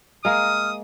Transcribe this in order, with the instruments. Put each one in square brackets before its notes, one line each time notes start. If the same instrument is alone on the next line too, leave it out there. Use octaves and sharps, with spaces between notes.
[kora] G#3 A#3 [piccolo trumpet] D#6 [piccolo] F6